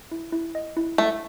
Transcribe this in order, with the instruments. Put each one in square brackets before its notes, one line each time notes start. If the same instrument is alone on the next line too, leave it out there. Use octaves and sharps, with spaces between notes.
[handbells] E4
E4
D#5
E4
[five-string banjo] A3 [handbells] E4